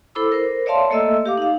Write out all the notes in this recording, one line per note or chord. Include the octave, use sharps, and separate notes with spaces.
E4 A4 C5 B5 D6 E6
A#4 C5
C#5 D5 E5 F5 A5 C6
A3 A#3 A4 D#5 E5 E6
G4 F5 D6
D#4 F5